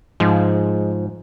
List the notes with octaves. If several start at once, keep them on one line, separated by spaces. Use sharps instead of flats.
G#2 F3 G#3